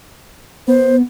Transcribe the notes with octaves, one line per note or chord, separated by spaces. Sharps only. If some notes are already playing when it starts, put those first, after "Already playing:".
B3 C5